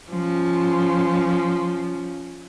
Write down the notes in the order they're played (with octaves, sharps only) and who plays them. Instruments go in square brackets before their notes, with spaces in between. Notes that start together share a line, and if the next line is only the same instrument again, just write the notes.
[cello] F3 C#4